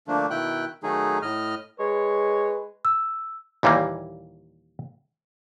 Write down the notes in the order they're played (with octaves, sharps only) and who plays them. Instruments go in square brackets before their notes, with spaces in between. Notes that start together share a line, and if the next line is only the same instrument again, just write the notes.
[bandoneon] D3 F3 A3 A#3 D4
B2 D#3 E4 G5 F#6
D#3 F#3 A3 D#4 G#4
A2 D#5 F6
[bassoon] G#3 [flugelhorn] B4 [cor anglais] C#5
[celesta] E6
[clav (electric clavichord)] D#2 A#2 E3 G3 A#3